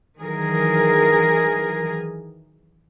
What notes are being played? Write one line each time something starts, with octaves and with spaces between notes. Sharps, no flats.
D#3 E3 F#3 G#4 A#4